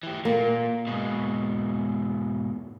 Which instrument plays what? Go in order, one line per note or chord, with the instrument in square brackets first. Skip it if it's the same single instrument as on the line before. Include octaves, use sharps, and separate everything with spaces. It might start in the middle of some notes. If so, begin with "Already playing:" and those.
[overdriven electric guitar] E3 G4
[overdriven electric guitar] A#2 [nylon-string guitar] A#3
[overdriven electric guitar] G#2 B2